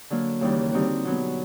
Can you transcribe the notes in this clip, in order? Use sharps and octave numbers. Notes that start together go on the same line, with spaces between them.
D3 F#3 A#3
D#2 C#3 E3 G3
D3 G3 C4 D#4 F#4
B2 F#3 B3